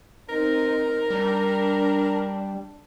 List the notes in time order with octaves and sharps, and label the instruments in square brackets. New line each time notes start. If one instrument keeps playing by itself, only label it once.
[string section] C4 D#4 [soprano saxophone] A#4
[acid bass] G3 [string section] D4